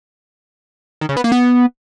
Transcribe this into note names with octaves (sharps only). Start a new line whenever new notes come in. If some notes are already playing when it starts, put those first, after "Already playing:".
D#3
C#3
B3
A#3
B3